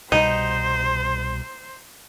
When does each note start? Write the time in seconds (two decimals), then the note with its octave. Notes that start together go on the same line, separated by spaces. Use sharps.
0.12 C2 B2 G3 D#4 C5